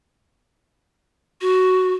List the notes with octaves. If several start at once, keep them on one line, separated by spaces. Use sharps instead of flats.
F#4